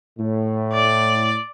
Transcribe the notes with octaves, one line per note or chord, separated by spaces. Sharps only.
A2
D5